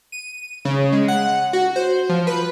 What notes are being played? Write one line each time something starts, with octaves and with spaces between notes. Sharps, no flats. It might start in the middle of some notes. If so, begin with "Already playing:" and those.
D#7
C#3
G#3
F#5
F#4
C5
F3
B4